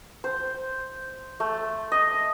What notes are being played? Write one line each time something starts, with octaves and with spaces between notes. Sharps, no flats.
C5
A3
D#5